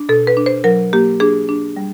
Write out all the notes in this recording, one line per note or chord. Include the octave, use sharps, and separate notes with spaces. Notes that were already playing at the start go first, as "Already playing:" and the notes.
Already playing: D4
B2 A4
B4
D4
C5
F#3 A#4
A#3 G4
D4 G#4
D4
G3